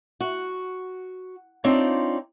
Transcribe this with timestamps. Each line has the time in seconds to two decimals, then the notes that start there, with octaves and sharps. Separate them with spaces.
0.21 F#4
1.64 C4 D4 D#4 F4 C#5 D5